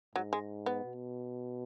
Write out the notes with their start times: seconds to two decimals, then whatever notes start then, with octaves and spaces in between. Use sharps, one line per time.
0.15 G#2 F#3
0.33 G#3
0.66 B3
0.84 B2